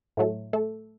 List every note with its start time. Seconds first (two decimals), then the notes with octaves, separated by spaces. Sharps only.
0.17 A2 F#3 A3
0.53 A3 A4